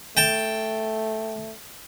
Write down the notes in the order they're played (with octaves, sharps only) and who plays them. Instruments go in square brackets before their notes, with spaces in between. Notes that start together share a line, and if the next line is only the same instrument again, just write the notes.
[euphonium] A3 [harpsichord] G5 A5